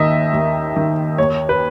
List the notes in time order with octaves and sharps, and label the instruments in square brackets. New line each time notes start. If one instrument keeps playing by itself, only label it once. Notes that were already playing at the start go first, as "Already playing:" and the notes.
Already playing: [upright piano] D#2 D#3 D#5 E5
D#2
D#3
D#2 C#5
B4